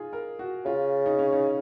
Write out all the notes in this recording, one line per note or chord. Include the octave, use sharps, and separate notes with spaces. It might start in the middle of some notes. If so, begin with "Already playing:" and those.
Already playing: D#4 F4 G#4
A#4
F#4
C#3 F4
D#4
C#4
D#4